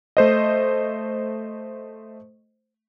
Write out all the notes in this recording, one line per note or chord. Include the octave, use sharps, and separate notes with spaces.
A3 C5 D#5